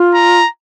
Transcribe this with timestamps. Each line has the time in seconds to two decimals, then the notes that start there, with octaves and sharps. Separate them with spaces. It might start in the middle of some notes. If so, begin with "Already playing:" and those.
Already playing: F4
0.14 A#5